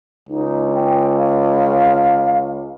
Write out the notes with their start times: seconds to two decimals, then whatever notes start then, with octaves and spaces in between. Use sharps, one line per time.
0.29 C#2 D#4
0.73 G5
1.17 F5